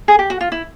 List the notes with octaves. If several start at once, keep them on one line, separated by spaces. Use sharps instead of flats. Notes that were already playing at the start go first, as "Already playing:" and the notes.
G#4
G4
F#4
F4
E4